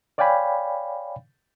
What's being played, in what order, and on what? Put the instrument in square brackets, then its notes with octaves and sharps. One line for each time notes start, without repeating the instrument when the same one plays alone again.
[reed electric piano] C#5 D5 F5 G5 G#5 B5